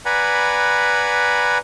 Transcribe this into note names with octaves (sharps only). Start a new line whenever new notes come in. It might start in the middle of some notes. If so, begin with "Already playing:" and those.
B4 D5 F#5 G#5 A#5 B5